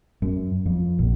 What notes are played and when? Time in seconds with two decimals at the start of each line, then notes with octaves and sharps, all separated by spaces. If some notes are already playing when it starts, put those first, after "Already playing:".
0.22 F#2
0.66 F2
0.99 A#1